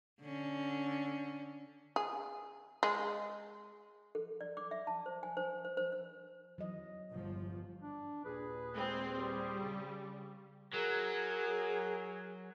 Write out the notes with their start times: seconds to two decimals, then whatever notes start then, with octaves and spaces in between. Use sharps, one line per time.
0.22 D3 C#4
1.96 G#4
2.83 G#3
4.15 A4
4.41 D5
4.57 D6
4.71 E5
4.87 A5
5.06 C5
5.23 G#5
5.37 C5
5.65 C5
5.77 C5
5.92 C5
6.58 E3 F#3 D#5
7.10 G1 E2 F3
7.82 D4
8.25 D#2 A#2 G#4 B4
8.73 G#3 C4
9.16 G3 C5
9.59 C#3
10.73 F#3 G#4 A#4